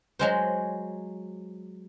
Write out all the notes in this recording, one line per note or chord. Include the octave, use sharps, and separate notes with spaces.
F#3 G#3 C5